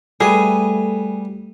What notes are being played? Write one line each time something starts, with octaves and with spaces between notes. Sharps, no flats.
G3 A3 G#4 B4